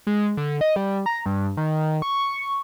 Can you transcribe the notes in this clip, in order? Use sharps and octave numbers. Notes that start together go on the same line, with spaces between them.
G#3
D3
D#5
G3
A#5
G2
D#3
C#6